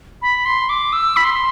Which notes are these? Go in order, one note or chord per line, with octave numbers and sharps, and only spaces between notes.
B5
C6
D6
E6
B5
C6